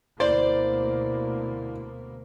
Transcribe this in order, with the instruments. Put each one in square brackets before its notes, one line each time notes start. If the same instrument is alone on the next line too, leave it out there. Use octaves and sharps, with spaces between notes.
[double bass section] D2 B2 A#3 [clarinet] E4 [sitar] C5 [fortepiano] D5